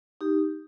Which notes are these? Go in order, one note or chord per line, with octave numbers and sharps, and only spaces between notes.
D#4 G4